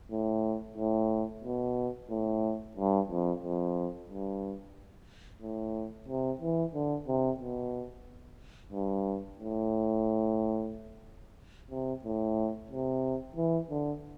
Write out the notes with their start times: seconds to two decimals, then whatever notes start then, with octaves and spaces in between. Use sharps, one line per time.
0.11 A2
0.78 A2
1.44 B2
2.10 A2
2.77 G2
3.09 F2
3.43 F2
4.10 G2
5.42 A2
6.08 C3
6.41 E3
6.74 D3
7.08 C3
7.40 B2
8.73 G2
9.39 A2
11.71 C3
12.04 A2
12.71 C3
13.36 E3
13.71 D3